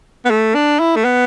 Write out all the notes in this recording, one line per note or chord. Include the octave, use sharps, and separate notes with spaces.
B3
A3
D4
E4
A3
B3